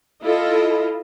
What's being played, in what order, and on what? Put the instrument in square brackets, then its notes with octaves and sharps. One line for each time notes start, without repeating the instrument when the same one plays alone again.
[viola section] E4 F4 A4 D#5